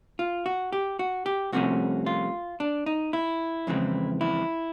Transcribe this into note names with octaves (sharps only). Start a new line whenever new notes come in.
F4
F#4
G4
F#4
G4
C2 C3 F3 A3 C#4 F#4
F4
D4
D#4
E4
F2 C#3 E3 G#3 C4
E4